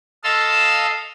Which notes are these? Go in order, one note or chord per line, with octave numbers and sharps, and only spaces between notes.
A4 D#5 F5 A5 C6 E6